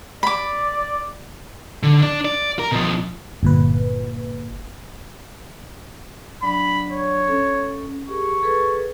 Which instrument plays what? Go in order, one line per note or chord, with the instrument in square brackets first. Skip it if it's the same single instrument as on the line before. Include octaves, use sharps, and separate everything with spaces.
[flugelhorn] D5 [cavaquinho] B5 D6
[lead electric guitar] D3
D4 D5
D5
A#4
B2 F3
[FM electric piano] G1 A#2 B4
[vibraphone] F#3 D4 D5 [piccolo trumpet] B5
[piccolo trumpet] C#5
[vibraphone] C#4 A4
[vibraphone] G4 G#4 A#4 [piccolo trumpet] C#6
[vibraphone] G#4 A4 B4